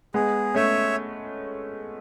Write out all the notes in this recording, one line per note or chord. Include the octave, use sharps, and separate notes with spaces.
G#3 B3 G#4
A3 C#4 C#5 E5